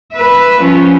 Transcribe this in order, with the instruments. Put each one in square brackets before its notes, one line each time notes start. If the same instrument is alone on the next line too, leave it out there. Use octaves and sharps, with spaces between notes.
[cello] B4 E5
F3 C#4